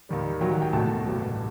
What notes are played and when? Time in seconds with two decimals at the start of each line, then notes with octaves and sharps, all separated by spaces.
0.09 D#2 D#3 G3
0.41 D#2 D#3 F#3 G5
0.51 G5
0.62 G5
0.73 C2 B2 A3 A5
1.06 A1 G2 F#3 A3